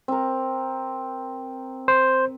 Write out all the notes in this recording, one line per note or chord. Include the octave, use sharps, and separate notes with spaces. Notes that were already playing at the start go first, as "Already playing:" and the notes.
C4 A#4
C5